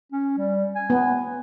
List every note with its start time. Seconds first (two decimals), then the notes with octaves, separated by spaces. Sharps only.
0.12 C#4
0.38 G3
0.75 G#5
0.90 B3